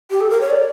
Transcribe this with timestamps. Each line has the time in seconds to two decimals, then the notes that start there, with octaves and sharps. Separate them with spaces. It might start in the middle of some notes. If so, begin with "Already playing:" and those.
0.11 G4
0.21 A4
0.30 A#4
0.41 C#5
0.50 D5